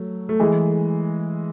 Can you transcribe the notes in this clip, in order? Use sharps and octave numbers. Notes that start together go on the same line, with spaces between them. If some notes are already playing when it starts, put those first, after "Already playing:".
Already playing: F#3 A3
A3
E3 G#3